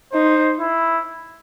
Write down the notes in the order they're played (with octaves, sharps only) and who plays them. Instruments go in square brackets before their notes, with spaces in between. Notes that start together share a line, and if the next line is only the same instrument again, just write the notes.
[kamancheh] D#4 [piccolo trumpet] C5
[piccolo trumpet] E4